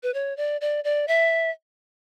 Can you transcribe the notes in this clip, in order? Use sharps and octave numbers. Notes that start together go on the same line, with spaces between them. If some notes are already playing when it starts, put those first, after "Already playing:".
B4
C#5
D5
D5
D5
E5